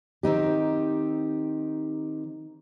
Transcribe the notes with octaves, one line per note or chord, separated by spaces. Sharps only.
D#3 C4 D#4 G4